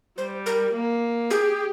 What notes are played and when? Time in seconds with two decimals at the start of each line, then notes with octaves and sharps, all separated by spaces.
0.18 G3 C5
0.46 A#4
0.74 A#3
1.30 G4 G#4